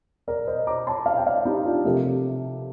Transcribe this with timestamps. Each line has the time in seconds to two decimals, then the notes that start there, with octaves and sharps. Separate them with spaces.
0.28 A#4 D5
0.47 C5 D#5
0.67 A#5 D6
0.87 A5 C6
1.06 F5 A5
1.17 G5
1.26 D5 F5
1.45 D#4 G4
1.65 D4 F4
1.85 C3 F3 A3 G4 A#4